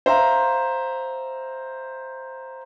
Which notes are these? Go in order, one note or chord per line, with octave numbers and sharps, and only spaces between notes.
C5 E5 F5 A#5